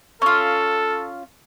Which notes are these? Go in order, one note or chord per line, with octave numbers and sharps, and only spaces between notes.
C#4 F4 A4